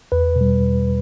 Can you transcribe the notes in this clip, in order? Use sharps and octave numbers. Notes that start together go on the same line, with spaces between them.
E2 B4
B2
G3